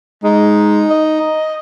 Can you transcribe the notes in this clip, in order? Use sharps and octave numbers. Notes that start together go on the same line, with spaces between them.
G#3 D#4
D#5